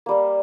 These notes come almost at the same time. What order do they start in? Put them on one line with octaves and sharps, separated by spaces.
A#3 G3 A#4